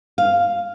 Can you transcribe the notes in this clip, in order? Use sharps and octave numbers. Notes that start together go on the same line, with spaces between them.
F5